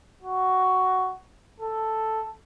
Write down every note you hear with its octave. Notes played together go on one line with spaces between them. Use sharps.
F#4
A4